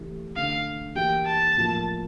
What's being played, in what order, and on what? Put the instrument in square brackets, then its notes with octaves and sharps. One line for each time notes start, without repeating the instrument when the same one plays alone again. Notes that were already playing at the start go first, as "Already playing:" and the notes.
Already playing: [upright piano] C#3 E3 A3 E4 G4
[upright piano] D3 A3 C#4 [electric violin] F5
[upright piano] E3 A#3 E4 G4 [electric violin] G5
[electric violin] A5
[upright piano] A2 F3 A#3